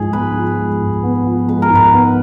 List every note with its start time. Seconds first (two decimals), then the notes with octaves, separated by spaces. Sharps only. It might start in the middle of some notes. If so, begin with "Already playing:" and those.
Already playing: G#2 F3 G#3 G#4
0.13 B3 B4
0.36 F3
0.58 G#3
0.80 G#2
1.03 B3
1.26 F3
1.48 G#3 B4
1.62 A#4
1.70 G#2
1.75 B4
1.93 B3